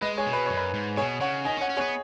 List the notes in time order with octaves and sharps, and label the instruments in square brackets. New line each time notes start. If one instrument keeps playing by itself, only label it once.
[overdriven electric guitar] G#3 [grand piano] B4 D#5
[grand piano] G#4 C#5
[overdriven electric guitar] B2
[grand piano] B4
[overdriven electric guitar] F#2 [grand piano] C#5
[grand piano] B4
[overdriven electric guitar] G#2
[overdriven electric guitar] B2 [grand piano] G#4 C#5
[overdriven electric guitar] C#3 [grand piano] C#5 F#5
[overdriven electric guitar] D#3 [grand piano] D#5 G#5
[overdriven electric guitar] C#4
[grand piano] C#5 F#5
[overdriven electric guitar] C#4
[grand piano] G#4 C#5
[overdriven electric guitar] B3